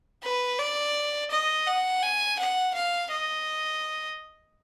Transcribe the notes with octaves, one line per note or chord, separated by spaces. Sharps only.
B4
D5
D#5
F#5
G#5
F#5
F5
D#5